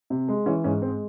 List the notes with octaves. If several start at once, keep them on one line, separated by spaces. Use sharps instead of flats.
C3
G#3
E3 C#4
G#2 C#4
G#3 C4